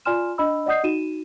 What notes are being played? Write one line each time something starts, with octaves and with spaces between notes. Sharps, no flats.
F4 D5 G#5 C6 F6 E7
D4 D#5 B5 E6
D5 D#5 F#5 D#6 G6 C7
D#4 F#4 D#7 E7